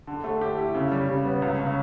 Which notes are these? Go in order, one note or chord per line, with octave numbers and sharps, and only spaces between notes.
D3
A3
G4
E4
C#3
G3
C#3
B3
C#2
C#3